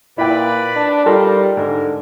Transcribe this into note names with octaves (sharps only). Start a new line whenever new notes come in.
A#2 E4 B4 D5 G5 B5
D4
G3 D#4 F4 A4 A#4
G#2 D3 A#4